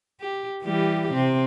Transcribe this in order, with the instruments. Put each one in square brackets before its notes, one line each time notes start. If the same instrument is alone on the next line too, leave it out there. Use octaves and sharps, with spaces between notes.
[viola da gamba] G4
E3 G3 G4
C3 C4